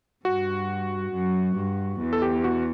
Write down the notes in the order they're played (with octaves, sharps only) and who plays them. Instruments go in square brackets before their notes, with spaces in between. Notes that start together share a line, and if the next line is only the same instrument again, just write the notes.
[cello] G2 [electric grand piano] F#4
[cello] F#2
G2
E2
[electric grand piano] A4
G4
F#4